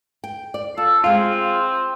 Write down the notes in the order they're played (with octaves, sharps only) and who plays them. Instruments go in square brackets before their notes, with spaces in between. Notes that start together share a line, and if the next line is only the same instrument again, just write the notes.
[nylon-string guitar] G5
D5
[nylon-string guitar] F4 [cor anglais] A4
[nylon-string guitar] G#3 F5 [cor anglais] C4 [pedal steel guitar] F4